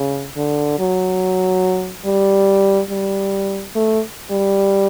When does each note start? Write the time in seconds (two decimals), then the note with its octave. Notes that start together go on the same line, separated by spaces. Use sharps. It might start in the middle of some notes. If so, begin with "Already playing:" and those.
Already playing: C#3
0.37 D3
0.79 F#3
2.05 G3
2.90 G3
3.75 A3
4.31 G3